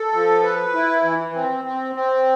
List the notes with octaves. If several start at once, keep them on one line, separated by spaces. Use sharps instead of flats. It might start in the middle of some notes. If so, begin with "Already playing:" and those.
Already playing: A4
F3
B4
E4
E3
C4
C4
C4